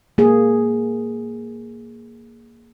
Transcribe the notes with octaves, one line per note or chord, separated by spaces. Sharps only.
A#3 G#4